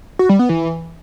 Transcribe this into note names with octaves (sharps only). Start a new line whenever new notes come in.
F#4
G3
B3
E3